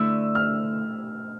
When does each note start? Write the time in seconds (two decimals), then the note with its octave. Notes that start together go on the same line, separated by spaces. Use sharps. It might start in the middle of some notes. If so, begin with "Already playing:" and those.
Already playing: D3 A3 E4 E6
0.35 F6